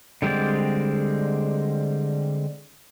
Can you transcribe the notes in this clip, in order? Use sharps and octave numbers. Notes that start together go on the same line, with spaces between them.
D3 G3 G#3 C4 D5